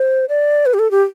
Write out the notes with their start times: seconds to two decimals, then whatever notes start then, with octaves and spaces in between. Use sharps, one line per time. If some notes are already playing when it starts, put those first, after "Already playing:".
Already playing: C5
0.29 D5
0.66 B4
0.74 G4
0.79 A4
0.91 G4